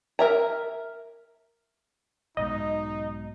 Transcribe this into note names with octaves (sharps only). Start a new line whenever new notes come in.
A#4 E5 A#5
B1 G#2 B2 D#4 D#5